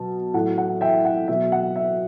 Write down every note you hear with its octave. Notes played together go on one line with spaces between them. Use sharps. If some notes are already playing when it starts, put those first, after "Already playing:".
Already playing: B2 F#3 A5
A2 F#3 F#5
F#5
E5 G5
F#5
B2 F#3 E5
F#5
E5